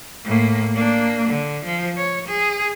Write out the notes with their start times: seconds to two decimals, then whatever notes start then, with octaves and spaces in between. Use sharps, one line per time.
0.25 A2 A#3
0.74 A#3 D4
1.29 D3
1.65 F3
1.97 C#5
2.28 G#4